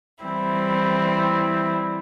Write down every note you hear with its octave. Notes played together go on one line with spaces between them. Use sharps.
E3 G3 C4 E4